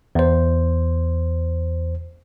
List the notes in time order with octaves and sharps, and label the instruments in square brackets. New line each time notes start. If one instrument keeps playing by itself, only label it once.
[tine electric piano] E2 C5